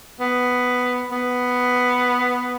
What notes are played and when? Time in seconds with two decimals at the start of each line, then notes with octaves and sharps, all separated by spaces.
0.20 B3
1.11 B3